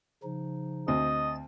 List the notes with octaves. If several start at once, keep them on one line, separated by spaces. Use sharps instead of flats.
C#3 F3 D#4
D2 C4 D#5 A6